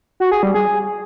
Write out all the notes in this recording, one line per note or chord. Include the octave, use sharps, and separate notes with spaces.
F#4
G#4
G3
G#4